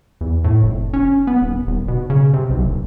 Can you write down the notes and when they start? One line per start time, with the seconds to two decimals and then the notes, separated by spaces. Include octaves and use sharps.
0.21 E2
0.44 A2
0.63 F1
0.93 C#4
1.27 B3
1.41 D#1
1.67 D#1
1.88 B2
2.10 C#3
2.33 C3
2.50 B1
2.65 D#1